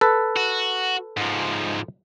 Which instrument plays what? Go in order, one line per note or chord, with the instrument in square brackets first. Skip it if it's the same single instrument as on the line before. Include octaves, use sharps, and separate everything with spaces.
[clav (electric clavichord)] A4 B4
[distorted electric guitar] F#4
G#2 F3